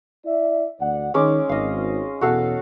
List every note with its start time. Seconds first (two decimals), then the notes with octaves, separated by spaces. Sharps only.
0.26 E4 D5 E5
0.80 D2 D5 F#5
1.14 D#3 G#3 C#4 D6
1.49 G#1 D#5 F5
2.21 E2 B2 F#4 A4 F5